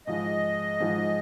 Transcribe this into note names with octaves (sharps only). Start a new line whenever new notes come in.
G#2 F3 G#3 D#5
G#2 F3 G#3